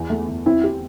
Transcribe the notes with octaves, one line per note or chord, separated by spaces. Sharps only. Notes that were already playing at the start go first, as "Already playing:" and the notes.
Already playing: E2 E3
A3
E2
C4 E4
G4